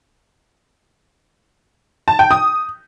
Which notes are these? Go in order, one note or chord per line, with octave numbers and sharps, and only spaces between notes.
A5
G5
D#6